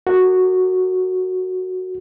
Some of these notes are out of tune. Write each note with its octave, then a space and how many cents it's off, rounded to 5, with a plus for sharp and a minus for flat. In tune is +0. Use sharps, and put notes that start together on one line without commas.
F#4 +0 A#4 -40